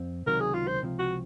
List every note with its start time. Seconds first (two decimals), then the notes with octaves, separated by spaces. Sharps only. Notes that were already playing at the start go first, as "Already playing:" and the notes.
Already playing: F2 C4
0.26 C#2 C3 D#3 F#3 A#4
0.40 G#4
0.54 F4
0.67 C5
0.81 C#2 C3 F3
0.99 F#4